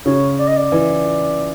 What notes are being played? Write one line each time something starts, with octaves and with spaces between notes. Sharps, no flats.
C#3 C#5
D5
D#5
D5
E3